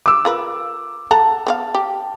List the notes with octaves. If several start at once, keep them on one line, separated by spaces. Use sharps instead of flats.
D6 E6
F4 A#4 B4
A4 F#5 A5 A#5
B3 C4 F5
G4